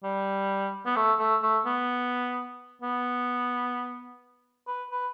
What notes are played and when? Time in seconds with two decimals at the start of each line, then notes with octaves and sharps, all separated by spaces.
0.03 G3
0.86 B3
0.96 A3
1.19 A3
1.43 A3
1.66 B3
2.82 B3
4.67 B4
4.91 B4